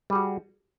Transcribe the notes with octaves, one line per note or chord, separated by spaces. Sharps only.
G3 F#4 G#4